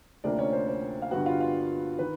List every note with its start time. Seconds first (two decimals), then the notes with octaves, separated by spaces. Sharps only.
0.24 D2 C3 F3 A#3 D4 D5
0.38 C#4 C#5
0.53 C5
0.68 C5
1.02 F5
1.11 G2 D3 G3 B3 F#4 F#5
1.26 F4 F5
1.40 F4 F5
1.99 D#3 B4